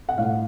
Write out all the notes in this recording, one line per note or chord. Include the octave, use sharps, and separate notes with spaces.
F#5
A2 F5